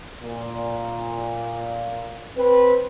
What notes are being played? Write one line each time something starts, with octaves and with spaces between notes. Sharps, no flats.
A#2
C4 B4